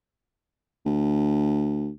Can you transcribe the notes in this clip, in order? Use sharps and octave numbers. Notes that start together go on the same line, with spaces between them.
D2